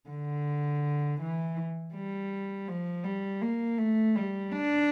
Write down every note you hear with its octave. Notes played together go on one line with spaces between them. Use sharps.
D3
E3
G3
F3
G3
A#3
A3
G3
D4